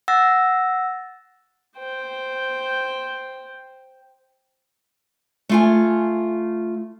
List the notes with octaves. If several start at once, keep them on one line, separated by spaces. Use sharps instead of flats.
F#5 E6 A6 A#6
C5 G5
A3 F4 G#5